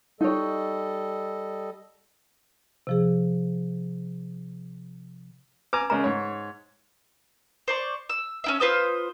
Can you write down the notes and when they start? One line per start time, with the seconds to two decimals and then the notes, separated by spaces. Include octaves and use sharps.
0.21 G3 D#4 A4 C#5 D#5
2.87 C3 F3 G#4
5.73 B4 G#5 A#5 D6
5.90 C#3 G#3 A#4 A#5
6.04 G#2 C#5
7.68 C5 D5 C#6
8.09 E6
8.44 C#4 E4 E5
8.60 F4 B4 C5 D#6